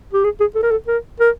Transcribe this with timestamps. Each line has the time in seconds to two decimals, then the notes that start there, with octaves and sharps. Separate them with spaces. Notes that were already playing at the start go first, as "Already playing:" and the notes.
0.14 G4
0.24 G#4
0.41 G#4
0.55 A4
0.63 A#4
0.71 A4
0.88 A#4
1.20 A#4